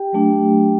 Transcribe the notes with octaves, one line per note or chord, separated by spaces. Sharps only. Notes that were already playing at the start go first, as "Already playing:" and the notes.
Already playing: G4 G5
F#3 A3 D4